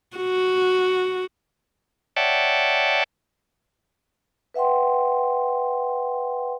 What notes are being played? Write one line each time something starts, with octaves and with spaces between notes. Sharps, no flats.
F#4
C#5 D5 E5 F#5 G5 A5
B4 E5 F#5 G5 C6